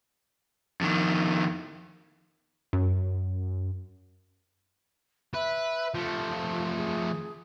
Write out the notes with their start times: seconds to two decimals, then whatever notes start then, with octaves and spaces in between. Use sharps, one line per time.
0.81 F2 D#3
2.73 F#2
5.34 B4 E5
5.95 F3 A3 F4
6.77 G#4